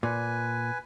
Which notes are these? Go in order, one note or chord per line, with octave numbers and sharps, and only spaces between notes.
A#2 B4 G#5